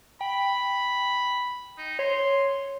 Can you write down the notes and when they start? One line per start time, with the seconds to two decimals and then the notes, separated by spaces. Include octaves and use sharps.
0.21 G5 B5
1.78 D#4
1.99 C#5 C6